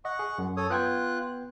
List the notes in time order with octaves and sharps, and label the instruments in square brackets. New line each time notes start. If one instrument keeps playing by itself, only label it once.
[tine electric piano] D#5 [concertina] F#5 C#6
[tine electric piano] G#4
F#2
[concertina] A4 C#5 D#6
[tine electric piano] B3 G5 G#6 [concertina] F4 F#6